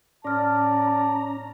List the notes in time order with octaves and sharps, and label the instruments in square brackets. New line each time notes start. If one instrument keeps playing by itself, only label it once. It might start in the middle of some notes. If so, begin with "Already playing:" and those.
[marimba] A2 F6 [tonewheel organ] C#4 A#5 [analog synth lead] D5 [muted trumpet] A5